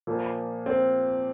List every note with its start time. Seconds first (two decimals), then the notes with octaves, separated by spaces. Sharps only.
0.07 A#2 F3 A#3
0.66 C4